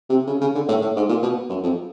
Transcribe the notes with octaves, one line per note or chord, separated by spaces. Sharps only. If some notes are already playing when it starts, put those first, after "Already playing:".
C3
C#3
C#3
D3
A2
A2
G#2
A#2
B2
F#2
F2